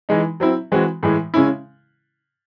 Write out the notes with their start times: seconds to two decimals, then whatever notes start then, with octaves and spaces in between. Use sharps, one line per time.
0.09 E3 G#3 D#4
0.40 F#3 C4 E4
0.72 E3 G#3 C4 F#4
1.03 A2 E3 G#3
1.34 C#3 G#3 C#4 E4